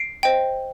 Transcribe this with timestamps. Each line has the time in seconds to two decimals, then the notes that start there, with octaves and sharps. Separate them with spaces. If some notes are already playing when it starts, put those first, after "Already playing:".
Already playing: C7 D7
0.23 C5 D#5 G5